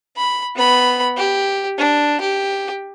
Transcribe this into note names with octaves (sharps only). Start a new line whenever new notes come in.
B5
B3 B5
G4
D4
G4